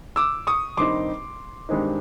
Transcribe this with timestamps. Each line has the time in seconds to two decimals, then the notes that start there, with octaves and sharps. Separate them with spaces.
0.16 D6 E6
0.47 C#6 D#6
0.77 G2 D#3 G3 C4 D#4 C6 D6
1.69 G2 D#3 G#3 C4 D#4